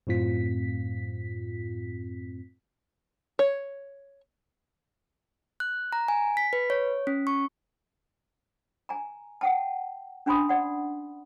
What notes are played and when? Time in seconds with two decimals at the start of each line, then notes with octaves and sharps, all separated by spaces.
0.07 F#2 A2 C4 F4 B6
3.39 C#5
5.60 F#6
5.93 A#5
6.08 G#5
6.37 B6
6.53 B4
6.70 C#5
7.07 C#4
7.27 C#6
8.89 G#5 A#5
9.41 F#5 G5 A5
10.26 C#4 D4 G#5 B5 C6 D#6
10.49 D5 F#5